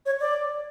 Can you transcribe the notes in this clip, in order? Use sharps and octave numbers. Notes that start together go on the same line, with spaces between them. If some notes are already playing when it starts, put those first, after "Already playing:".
C#5
D5